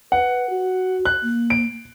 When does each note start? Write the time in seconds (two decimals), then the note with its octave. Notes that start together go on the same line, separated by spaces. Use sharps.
0.12 B4 F#5
0.50 F#4
1.05 F#6
1.23 A#3
1.50 D7